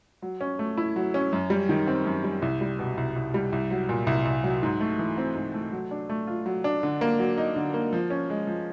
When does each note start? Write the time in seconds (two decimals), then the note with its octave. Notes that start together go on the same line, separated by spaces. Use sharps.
0.22 F#3
0.41 C#4
0.59 A3
0.78 E4
0.96 F#3
1.14 C#4
1.33 F#2
1.50 G3
1.69 D#3
1.87 C4
2.06 F#2
2.24 G3
2.42 C2
2.61 G3
2.79 B2
2.97 C2
3.16 C2
3.34 G3
3.52 C2
3.71 F#3
3.89 A#2
4.07 C2
4.25 C2
4.44 F#3
4.63 G#2
4.81 A3
4.99 E3
5.17 C4
5.35 G#2
5.54 A3
5.72 F#3
5.91 D4
6.09 A3
6.27 F4
6.46 F#3
6.64 D4
6.83 D3
7.01 A#3
7.19 F#3
7.38 D#4
7.56 D3
7.74 A#3
7.93 F3
8.10 C#4
8.30 G#3
8.47 F3